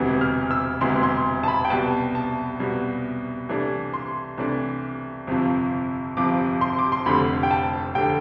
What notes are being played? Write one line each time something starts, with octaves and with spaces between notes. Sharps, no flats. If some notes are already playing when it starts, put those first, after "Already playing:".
Already playing: E1 D2 C3 E3 B3
F6
E6
E1 D2 C3 E3 B3 C6
C6
A5
B5
G5
C2 B2 G3 B3 A5
A5
C2 B2 G3 B3
C2 C3 E3 A3 D4
C6
C2 C3 E3 A3 D4
G1 F2 C3 F3
G1 F2 C3 F3 D6
C6
D6
C6
F1 F2 D3 A3 B5
G5
A5
F1 D3 A3 G5